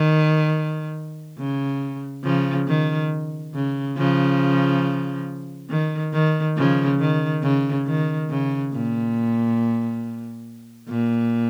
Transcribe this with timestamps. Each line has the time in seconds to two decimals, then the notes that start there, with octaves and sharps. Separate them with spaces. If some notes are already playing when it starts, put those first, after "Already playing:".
Already playing: D#3
1.38 C#3
2.24 C#3 F3
2.67 D#3
3.54 C#3
3.97 C#3 F3
5.69 D#3
6.13 D#3
6.57 C#3 F3
6.99 D#3
7.43 C#3
7.87 D#3
8.29 C#3
8.73 A#2
10.89 A#2